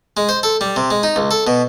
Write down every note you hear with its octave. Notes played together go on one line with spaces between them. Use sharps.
G#3
C5
A4
G3
C3
G#3
D#4
C#2
A4
B2